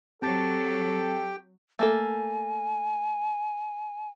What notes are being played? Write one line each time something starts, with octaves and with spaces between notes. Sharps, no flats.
F#3 C4 G4 A4 G5 A5 A6
A3 A#3 A4 G#5